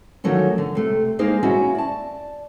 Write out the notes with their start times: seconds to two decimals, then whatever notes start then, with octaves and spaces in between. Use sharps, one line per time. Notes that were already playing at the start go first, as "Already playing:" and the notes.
0.24 D3 D#3 F3 F#3 A3 C#4
0.58 D3
0.75 C3 A3
1.19 G#3 A#3 D#4 G#4 C5 F5
1.43 A#3 C#4 E4 F#4 E5
1.75 D5 A5